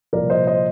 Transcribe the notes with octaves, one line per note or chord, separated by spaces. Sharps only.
C2 A#2 F3 A#4 D5
C5 D#5
C5 D#5